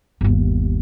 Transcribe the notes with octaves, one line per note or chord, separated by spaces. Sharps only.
G1 D#2